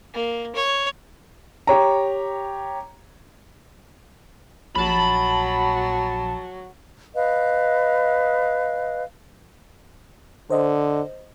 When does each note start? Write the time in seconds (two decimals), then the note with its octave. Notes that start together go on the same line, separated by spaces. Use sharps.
0.15 A#3
0.55 C#5
1.67 G4 C#5 A#5
4.75 A#1 F#3 A5 B5
7.15 B4 D#5 F5
10.50 D3 C5 D#5